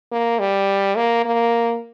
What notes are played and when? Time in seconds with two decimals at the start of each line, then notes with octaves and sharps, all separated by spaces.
0.11 A#3
0.39 G3
0.97 A#3
1.25 A#3